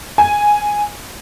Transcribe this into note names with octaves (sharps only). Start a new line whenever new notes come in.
G#5